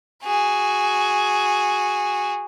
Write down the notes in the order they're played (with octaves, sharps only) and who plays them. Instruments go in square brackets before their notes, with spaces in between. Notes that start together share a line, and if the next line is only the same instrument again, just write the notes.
[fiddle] F#4 G#4